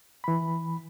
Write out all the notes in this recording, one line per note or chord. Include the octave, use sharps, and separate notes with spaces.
E3 B5